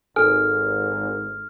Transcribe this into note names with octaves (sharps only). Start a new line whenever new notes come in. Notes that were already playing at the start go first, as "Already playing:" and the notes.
G#1 A4 G#5 F6